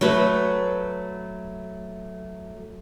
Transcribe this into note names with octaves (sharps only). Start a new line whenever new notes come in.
F#3 A3 B4